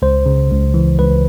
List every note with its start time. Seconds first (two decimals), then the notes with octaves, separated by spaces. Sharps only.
0.02 C#2 C5
0.26 C#3
0.51 C#2
0.74 E3
0.98 C#2 B4